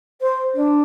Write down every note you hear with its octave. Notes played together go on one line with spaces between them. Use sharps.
C5
D4